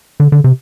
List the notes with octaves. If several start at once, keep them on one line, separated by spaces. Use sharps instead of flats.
D3
D3
C3